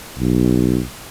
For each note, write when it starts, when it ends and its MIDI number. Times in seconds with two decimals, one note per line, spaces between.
0.19 0.81 35